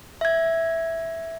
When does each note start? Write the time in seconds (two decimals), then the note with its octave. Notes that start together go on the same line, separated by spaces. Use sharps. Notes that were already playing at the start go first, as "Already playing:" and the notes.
0.21 E5 G#6